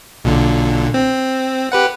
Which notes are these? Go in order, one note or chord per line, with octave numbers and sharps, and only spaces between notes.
B1 A#2 D3
C4
G4 B4 F#5